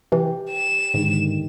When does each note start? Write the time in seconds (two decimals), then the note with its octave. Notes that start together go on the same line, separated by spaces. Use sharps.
0.12 C3 E3 G4
0.50 E7
0.94 G#2 D3 D#3